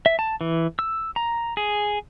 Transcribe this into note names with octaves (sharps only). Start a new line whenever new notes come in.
E5
A5
E3
E6
A#5
G#4